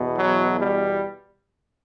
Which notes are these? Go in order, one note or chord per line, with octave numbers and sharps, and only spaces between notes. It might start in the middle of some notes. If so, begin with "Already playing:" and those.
Already playing: E2 B2
F#3
G3